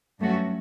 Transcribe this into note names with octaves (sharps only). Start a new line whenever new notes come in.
G2 F#3 A3 C#4 F#4